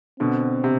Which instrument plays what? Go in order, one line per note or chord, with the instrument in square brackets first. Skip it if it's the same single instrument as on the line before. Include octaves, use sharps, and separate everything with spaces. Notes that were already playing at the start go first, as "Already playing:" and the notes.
[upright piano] B2 D3 [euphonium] C4
[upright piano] C3